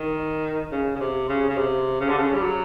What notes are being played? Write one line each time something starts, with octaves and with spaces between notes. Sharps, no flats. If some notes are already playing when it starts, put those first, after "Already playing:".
Already playing: D#3
C#3
C#3
C3
C#3
C#3
C3
C#3
D3
C#3
G3
F#3